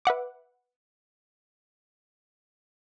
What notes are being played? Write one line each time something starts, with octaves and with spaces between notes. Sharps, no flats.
B4 E5 F#5 D6